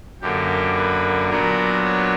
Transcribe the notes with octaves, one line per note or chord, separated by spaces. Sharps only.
F#2 D3 A#3 G4
B4
A#2 F#3 B3 D4 A#4
C#5